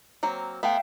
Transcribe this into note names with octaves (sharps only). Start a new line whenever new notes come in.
F#3 A#3 C4
A3 B3 E5 F5 G5